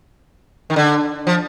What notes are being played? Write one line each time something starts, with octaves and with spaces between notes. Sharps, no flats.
D#3
D3
F3